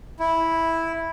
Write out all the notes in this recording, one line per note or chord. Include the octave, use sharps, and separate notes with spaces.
E4